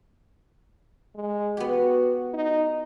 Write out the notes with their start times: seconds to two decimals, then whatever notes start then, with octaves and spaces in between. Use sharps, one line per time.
1.15 G#3
1.57 B3 F#4 G4
2.34 D#4